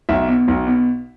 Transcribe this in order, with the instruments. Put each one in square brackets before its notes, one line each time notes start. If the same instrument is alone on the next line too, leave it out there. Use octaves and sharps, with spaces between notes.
[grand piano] B1 E5
B2
B1
B2